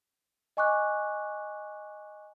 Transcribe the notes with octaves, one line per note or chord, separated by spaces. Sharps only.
D#5 G#5 C#6 D6 F#6